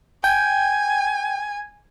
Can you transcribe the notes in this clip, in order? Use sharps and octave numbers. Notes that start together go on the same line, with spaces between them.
G5 G#5